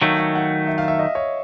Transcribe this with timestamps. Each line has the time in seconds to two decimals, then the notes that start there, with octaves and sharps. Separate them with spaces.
0.02 D#3 F#3 A3 F5
0.19 F5
0.35 F#5
0.67 E5
0.78 F5
0.88 E5
0.99 D#5
1.15 C#5